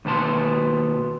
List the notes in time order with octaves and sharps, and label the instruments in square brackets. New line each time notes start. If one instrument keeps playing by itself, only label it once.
[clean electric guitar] D#2 B2 B3 A5 C6